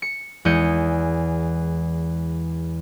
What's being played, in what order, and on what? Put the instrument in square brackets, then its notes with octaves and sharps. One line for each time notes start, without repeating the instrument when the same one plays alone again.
[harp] C#7
E2 G#3 E4 D#6 G6 C#7